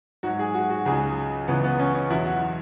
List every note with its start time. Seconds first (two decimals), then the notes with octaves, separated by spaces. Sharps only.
0.23 G#2 F#3 F#4
0.39 G#4
0.54 F#4
0.70 F#4
0.85 C#2 C#3 F#3 G#4
1.48 C#2 C#3 E3 B3
1.64 B3
1.79 C#4
1.95 C#4
2.10 E2 B2 F#3 E4
2.26 F#4